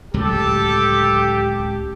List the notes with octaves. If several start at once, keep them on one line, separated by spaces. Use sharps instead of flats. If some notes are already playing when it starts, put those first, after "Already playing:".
D1 C#2 F#3 G4 A4